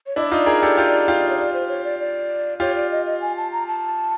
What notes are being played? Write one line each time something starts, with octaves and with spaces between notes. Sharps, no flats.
C#5
D4 E4 D#5
D5
D#4 F4
G#4 A#4
G4 A4
F4 G4
F4 G4
C#5
D5
C5
C#5
D5
D5
F4 G4 C#5
D5
D#5
D#5
G#5
A5
A#5
A5